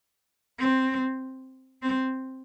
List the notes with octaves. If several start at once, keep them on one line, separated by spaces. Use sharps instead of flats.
C4
C4